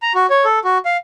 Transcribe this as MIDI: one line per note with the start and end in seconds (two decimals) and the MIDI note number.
0.02 0.13 82
0.15 0.26 66
0.30 0.45 73
0.45 0.59 69
0.64 0.78 66
0.85 0.97 77